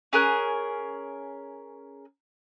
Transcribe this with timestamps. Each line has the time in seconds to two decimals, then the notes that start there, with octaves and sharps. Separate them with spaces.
0.13 C#4 G#4 A#4 F#6